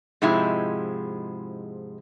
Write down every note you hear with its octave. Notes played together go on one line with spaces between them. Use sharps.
G#2 C3 F3 G#3 E4